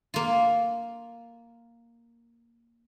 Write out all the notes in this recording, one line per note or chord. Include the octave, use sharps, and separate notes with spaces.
A#3 F4